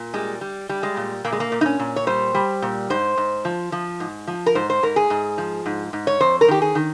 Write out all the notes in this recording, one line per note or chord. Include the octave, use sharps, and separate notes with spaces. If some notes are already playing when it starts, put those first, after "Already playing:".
Already playing: A#2
G3 G#3
G3
G3
G#3
A#2
A#2 A#3
G#3
A#3
A#2
D#4
C#4
A#2
C#5
G3 C5
G3
A#2
G#2 C5
G#2
F3
F3
G#2
F3
A#4
G#2 C5
C5
G#2 A#4
G#4
G#2
F3
G#2
G#2
C#5
F2 C5
A#4
D#3 G4
G#4
D#3